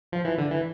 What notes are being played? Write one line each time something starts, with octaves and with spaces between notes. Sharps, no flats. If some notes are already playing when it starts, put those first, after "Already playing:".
F3
E3
D3
E3